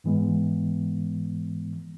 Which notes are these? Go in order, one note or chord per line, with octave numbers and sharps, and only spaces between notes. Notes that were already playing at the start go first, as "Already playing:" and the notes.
G#2 E3 G#3 B3